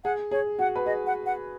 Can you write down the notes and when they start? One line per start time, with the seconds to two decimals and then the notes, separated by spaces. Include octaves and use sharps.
0.04 G#4 F#5
0.31 G#4 C#5
0.59 F#4 F#5
0.76 B4
0.86 G#4 D#5
1.07 F#5
1.26 F#5